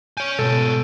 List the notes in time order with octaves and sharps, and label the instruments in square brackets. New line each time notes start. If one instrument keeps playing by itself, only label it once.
[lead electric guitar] C#5 G#5 [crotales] G6 D7 D#7
[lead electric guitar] G#2 B3 [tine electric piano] B2 [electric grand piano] A4